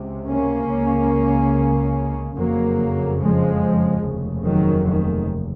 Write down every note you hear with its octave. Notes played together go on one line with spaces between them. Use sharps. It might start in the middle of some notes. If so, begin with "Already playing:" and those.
Already playing: C#2 C3
A#3 C#4
C#2 C#3
F#1 F2 C#3 F#3 A#3
F3 G#3
F1 D#2 C#3
D#3 F#3
D#3